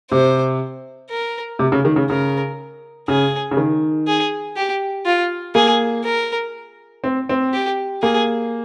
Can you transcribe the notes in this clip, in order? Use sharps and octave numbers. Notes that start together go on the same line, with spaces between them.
C3 C5
A#4
C3
C#3
D#3
C#3
C#3 A#4
C#3 G#4
C#3
D#3
G#4
G4
F4
A#3 G#4
A#4
C4
C4
G4
A#3 G#4